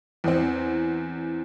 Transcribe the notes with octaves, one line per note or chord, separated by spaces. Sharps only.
E2 C4